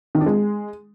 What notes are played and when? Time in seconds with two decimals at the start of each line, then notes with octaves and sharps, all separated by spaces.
0.15 D#3
0.21 D4
0.26 G#3